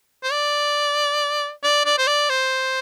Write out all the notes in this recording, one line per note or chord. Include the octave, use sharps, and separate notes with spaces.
C5
D5
D5
D5
C5
D5
C5